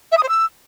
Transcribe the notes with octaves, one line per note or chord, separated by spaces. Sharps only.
E5
D#6
C5
E6